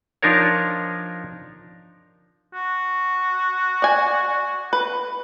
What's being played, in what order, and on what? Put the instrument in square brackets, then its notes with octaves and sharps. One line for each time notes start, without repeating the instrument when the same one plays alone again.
[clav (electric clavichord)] F3 D4 D#4 A#4 C#5
[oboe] F#4
[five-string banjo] D5 G#5
B4